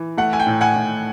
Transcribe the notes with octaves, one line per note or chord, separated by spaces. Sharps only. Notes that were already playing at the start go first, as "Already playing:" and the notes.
Already playing: E3
A3 F#5
G#5
G5
A2
F#5 G#5
A2